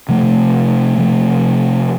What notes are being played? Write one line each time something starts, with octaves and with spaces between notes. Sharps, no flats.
C3 F3 A3
C3 F3 A3